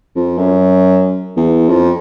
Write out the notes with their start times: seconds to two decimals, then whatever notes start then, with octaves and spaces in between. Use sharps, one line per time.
0.16 F2
0.38 F#2
1.37 E2
1.69 F2